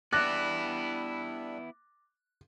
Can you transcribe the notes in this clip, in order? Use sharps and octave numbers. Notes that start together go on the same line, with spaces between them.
G3 B3 D4 E4 D6 F#6 A6 A#6